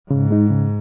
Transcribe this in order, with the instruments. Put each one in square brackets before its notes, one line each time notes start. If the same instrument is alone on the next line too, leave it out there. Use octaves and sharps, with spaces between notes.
[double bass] G#2 [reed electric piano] C#3
[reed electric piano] G#3 D#4
C#3